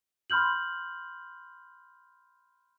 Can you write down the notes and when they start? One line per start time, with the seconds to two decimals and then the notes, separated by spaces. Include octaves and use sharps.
0.30 B5 C6 F6 G6 F#7